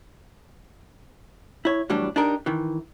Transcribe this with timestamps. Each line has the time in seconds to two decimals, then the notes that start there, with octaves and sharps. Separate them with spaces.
1.65 E4 C#5
1.90 A2 E3 F#3 G3 D4
2.16 D4 D#4 G4 A#4
2.46 D#3 E3